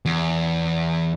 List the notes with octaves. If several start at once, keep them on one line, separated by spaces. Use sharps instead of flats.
E2